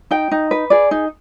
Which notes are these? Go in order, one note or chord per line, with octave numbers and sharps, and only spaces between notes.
D#4 G5
D#4
B4
G#4 D5
D#4